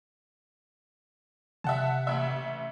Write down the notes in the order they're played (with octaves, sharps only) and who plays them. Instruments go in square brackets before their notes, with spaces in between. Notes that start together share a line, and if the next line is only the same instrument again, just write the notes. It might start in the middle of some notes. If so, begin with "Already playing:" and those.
[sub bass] C3 [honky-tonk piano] E5 F#5 A5
[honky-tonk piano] A1 E5